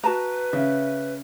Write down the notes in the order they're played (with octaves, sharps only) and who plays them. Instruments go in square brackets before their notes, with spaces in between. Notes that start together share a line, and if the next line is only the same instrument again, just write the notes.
[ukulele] F#4 A5 A#5 [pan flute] B4
[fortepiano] C#3 [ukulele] E5